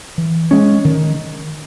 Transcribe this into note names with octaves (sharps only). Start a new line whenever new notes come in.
E3
G#3 C#4
D#3